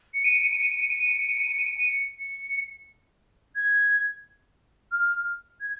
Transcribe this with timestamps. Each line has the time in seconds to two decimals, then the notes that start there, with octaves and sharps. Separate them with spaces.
0.14 C#7
0.24 D#7
0.34 C#7
0.43 D#7
0.53 C#7
0.62 D#7
0.72 C#7
0.81 D#7
0.90 C#7
1.00 D#7
1.09 C#7
1.20 D#7
1.29 C#7
1.38 D#7
1.49 C#7
1.58 D#7
1.67 C#7
1.77 D#7
1.86 C#7
2.19 C#7
3.56 G#6
4.92 F6
5.61 G#6